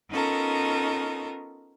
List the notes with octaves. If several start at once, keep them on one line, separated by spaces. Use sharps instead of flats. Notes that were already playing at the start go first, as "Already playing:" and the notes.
B3 C#4 D#4 F4 A4 A#4